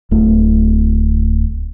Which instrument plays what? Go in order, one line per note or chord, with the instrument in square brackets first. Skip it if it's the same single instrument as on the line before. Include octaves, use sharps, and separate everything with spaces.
[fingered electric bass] D1 A3